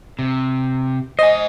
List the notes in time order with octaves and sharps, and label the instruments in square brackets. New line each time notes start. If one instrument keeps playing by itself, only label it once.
[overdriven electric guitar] C3
[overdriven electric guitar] C5 G#5 [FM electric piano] D#5